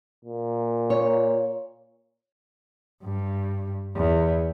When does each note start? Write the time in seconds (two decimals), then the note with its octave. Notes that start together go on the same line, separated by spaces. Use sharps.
0.25 A#2
0.90 C#5
3.02 G2
3.96 E2